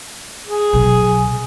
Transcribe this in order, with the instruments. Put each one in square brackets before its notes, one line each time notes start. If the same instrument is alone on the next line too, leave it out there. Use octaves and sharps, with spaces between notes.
[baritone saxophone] G#4
[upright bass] B1